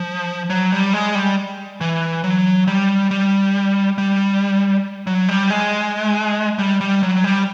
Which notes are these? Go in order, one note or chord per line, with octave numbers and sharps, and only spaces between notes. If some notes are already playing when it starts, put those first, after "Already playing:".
Already playing: F3
F#3
G3
G#3
G3
E3
F#3
G3
G3
G3
F#3
G3
G#3
G3
G3
F#3
G3